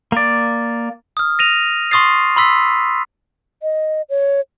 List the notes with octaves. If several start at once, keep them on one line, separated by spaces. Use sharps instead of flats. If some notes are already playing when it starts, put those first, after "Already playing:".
A#3 D5
D#6 F6
A#6 D#7 F7
C6 C#6 D#6 A6 C7
B5 C6 E6 B6
D#5
C#5